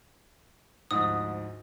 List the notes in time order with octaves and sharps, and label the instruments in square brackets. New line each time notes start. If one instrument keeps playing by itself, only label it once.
[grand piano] D2 G#2 F3 [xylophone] D#6